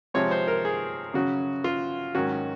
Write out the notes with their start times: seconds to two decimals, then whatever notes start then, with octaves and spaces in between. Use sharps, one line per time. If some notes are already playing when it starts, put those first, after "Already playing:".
0.14 C3 F3 G#3 C4 C#5
0.31 C5
0.48 A#4
0.65 G#4
1.14 C#3 F#3 C#4 F#4
1.64 F4
2.15 G#2 D#3 F#3 C#4 F#4